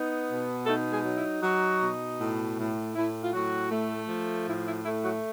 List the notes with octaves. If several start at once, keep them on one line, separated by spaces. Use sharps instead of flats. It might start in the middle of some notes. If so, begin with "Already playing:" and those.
Already playing: B3 D#4
B2
A3 D#4 A4
G#3 G#4
F#3
E4
F#3 D#4 F#4
B2
A2
A2
A2 E4
F4
A2 F#3 F#4
A3
F3
A2 E4
E4
A3 E4
F#3 F#4